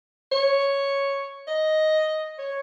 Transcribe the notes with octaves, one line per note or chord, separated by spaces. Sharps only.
C#5
D#5
C#5